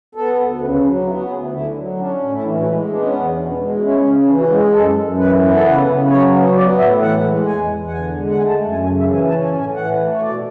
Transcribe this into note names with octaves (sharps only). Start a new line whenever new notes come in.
B3 A4
D2
C#3 B4
B4
F#3 C#4
D4
B3 E4
F#4
D2 G#4
E4
D3 E4
F#3
C#4 D4
A2
E4
E3 D4
F#4
G#3 E4
B3 D4
C#4
E2 D4
B2 D4
C#4
G#3 D4
E4
F#4
C#4 E4
C#3
E3 D4
F#4
G#3 F#4
G#4
F#2 A4
F#2
E3 B4
B3
A4
C#3 B4
C#3
F#3 C#5
B3
B3 D5
A2 E5
E3 F#5
G#3
E2 G#5
E2
F#5
D3 G#5
G#3
F#5
A3 G#5
A5
F#2
G#5
C#3 G#5
E5
E3
G#5
C#4 A5
G#5
A2
G#5
E3 F#5
A3
C#5
B2 D5